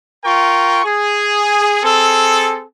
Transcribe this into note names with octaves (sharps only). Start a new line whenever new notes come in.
F4 A#4 G5 C#6
G#4
C4 G#4 A4